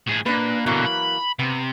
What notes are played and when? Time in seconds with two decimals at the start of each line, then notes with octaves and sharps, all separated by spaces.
0.08 A2 G#4
0.26 A#2 D4 B4
0.66 B2 D3 E3 F#3 A#3
0.86 B5
1.39 C3 B3